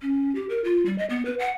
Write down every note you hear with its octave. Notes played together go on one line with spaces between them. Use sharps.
C#4
G4
A#4
F4
G3
D#5
B3
B4
F#5